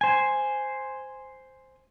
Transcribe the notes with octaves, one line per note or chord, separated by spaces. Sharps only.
C5 G#5